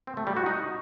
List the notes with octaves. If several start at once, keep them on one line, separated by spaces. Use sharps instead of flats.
C4
A3
G3
F#4
D#4